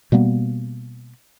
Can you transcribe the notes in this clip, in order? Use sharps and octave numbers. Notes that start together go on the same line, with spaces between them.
B2 G3 A#3 B3